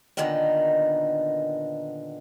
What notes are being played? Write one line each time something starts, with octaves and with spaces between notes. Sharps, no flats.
A#2 D3 D#3 B3 D#4